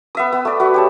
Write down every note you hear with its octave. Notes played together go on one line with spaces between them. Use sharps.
B3 E5 D#6
B3
A3 D5
F#4 B4 E5
G4 C#5 A5